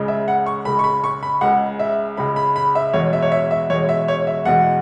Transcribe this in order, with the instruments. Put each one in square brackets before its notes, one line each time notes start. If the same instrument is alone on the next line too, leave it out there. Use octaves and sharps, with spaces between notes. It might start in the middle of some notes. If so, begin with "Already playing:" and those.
Already playing: [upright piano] C#2 C#3 G#3
E5
F#5
C#6
C#2 C#3 G#3 B5
C#6
B5
C#6
B5
C#2 C#3 G#3 F#5
E5
C#2 C#3 G#3 B5
B5
B5
E5
E2 B2 G#3 C#5
E5
C#5
E5
E5
E2 B2 G#3 C#5
E5
C#5
E5
E2 B2 G#3 F#5